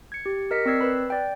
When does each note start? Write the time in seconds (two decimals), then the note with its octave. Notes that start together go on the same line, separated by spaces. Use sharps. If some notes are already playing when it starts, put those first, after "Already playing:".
0.12 G#6 C#7
0.26 G4
0.51 A#4 D#5 B6 C#7
0.66 C4 D5 E6 G#6 C7
0.81 B4 B5
1.10 D5 G5